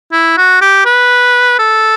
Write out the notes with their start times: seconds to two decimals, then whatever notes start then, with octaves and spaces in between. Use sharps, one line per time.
0.12 E4
0.37 F#4
0.61 G4
0.86 B4
1.59 A4